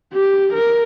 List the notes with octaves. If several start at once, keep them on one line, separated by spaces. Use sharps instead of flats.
G4
A#4